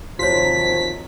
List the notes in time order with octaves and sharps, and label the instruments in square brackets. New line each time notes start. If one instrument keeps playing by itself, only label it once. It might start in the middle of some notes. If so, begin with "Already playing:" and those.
[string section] D#2 C3 D#3 [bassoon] F3 [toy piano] F#4 C#5 [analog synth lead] B6